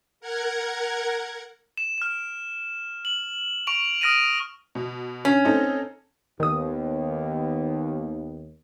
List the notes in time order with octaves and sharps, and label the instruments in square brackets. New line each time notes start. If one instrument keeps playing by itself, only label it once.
[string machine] A#4 F#5 G#6
[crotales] E7
F6 E7
F#7
C#6 D7 F7
D#6 F6 A#6 D7 D#7
[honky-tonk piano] B2
[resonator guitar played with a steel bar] C#4
[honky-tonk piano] C4 D#4 A4
[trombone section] D#2 [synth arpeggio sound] D#3 D#6 [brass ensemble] B3